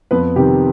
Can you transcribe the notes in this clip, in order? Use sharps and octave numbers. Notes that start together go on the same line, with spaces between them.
F2 B3 B4
C3 D#3 G4